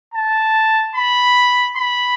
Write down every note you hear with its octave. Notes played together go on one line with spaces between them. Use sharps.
A5
B5
B5